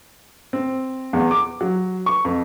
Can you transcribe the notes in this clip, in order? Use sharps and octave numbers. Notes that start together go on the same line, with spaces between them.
C4
E2
D6
F#3
C#6
F2